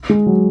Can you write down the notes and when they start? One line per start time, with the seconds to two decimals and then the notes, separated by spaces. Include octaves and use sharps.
0.10 G#3
0.26 F#3